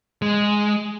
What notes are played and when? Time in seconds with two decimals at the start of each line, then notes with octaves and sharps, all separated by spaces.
0.22 G#3